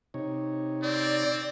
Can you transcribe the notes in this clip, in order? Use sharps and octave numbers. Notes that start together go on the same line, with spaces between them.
C3 D#4 C#5
C4 D5